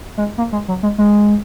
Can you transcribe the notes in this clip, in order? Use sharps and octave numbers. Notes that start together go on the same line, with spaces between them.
G#3
A#3
G#3
F#3
G#3
G#3